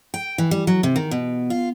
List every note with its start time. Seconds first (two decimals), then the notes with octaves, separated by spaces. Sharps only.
0.14 G5
0.38 E3
0.51 G3
0.67 F#3
0.83 C3
0.96 D#3
1.11 B2
1.50 F4